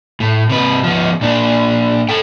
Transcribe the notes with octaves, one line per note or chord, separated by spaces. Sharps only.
A2
C3 B4
F3 B3
A#2 D4
A4 G5